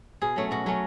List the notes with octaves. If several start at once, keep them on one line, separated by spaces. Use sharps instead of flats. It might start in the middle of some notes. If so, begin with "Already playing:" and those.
B2 G#4
F#3 A3 C#4
B2 F#4
F#3 A3 C#4